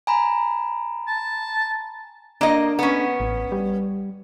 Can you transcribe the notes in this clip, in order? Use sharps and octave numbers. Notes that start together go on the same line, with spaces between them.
G#5 A#5 B5
A5
A#3 D4 D#5
B3 C#4
A1
G3